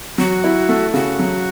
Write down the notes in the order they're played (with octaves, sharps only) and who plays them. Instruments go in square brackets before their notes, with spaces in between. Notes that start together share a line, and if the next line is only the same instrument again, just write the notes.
[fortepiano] F#3 [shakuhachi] F#4
[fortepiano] E4
A3
[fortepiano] C#3 [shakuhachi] F#4
[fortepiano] F#3